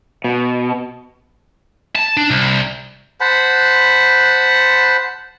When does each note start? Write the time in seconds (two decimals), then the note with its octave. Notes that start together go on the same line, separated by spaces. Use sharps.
0.24 B2
1.95 A5
2.17 D4
2.31 C2
3.21 C5 F#5 A5 B5